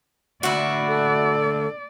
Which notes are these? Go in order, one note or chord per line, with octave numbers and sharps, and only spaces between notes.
D2 E4 F#4 D5
A4